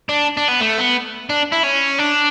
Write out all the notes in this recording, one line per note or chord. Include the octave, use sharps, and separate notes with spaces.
D4
D4
B3
A3
B3
D4
E4
C#4
D4